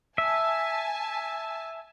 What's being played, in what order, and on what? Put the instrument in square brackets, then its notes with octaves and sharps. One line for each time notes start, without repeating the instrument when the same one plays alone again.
[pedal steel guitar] E5 [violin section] G#5 A5